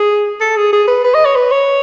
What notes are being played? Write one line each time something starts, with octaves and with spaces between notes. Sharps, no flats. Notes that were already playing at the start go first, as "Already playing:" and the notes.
Already playing: G#4
A4
G#4
G#4
B4
B4
D#5
C#5
B4
C#5